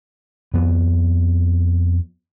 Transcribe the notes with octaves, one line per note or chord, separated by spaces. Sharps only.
F2 B3